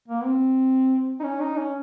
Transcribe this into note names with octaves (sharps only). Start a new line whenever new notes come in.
A#3
C4
D#4
C#4
D#4
C#4